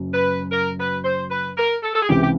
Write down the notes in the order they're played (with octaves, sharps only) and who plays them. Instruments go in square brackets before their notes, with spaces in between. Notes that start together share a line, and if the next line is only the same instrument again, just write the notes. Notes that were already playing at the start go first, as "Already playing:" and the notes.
Already playing: [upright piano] F#1 F#2
[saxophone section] B4
A#4
B4
C5
B4
A#4
A4
A4
G#4
[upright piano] C#2 C3 E3 [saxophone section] G4
[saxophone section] G4